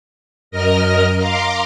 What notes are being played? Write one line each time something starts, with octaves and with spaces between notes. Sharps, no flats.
F#2 A#4 D#5 F6 A#6
F5 A#5 C6 D6